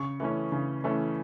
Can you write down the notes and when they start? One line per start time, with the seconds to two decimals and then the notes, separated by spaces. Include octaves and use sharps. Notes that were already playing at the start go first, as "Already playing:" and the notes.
Already playing: C#3 C#6
0.20 E3 A3 C#4
0.52 C#3
0.84 E3 A3 C#4